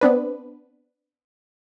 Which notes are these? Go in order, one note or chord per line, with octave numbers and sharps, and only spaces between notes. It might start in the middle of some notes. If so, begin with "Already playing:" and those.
B3 C4 D4 B4